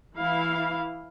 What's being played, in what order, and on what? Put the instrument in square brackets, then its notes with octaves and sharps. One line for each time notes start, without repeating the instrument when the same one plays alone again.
[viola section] E3 E4 F5